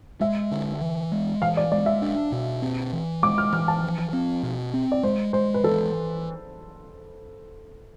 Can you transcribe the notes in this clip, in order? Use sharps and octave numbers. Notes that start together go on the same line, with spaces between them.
G#3 E5
D3
E3
G#3
E3 F5
D5
G#3 D5
E5
D4
B2
C4
E3
G#3 D6
F6
E3 F6
A5
F3
C4
B2
C4
D5
G#3 C5
G#3 C5
B4
E3 A4